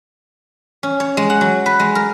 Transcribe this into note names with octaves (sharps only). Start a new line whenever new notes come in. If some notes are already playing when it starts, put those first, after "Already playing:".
C#4
C#5
G#3
F#5
F#3
B4
G#3
A#4